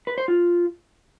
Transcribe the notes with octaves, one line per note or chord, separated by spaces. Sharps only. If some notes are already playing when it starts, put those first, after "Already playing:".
B4
C5
F4